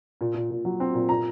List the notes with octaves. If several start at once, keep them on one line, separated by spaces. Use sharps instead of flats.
A#2
A#2
A#2
F#3
C4
A#2
A#2 A#5